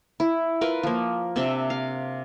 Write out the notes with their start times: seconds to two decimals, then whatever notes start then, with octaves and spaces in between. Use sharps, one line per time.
0.20 E4
0.61 F4 A#4 B4
0.83 F3 A#3
1.36 C3 C4 D4 E5
1.70 F5